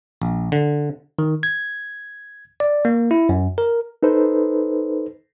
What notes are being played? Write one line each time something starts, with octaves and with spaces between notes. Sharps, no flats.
A#1
D3
D#3
G#6
D5
A#3
E4
F#2
A#4
D#4 A4 B4 C5